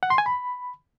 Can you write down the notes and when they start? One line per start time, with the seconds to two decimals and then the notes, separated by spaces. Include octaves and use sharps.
0.03 F#5
0.10 C6
0.18 G#5
0.26 B5